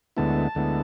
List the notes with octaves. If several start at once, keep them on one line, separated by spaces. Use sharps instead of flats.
D2 D3 G#3 B3 E4 A5
D2 D3 G#3 B3 E4